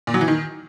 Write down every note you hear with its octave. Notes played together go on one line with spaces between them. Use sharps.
A#2
F#3
E3
D#3